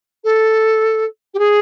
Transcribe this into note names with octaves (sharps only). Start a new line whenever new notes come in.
A4
G4
G#4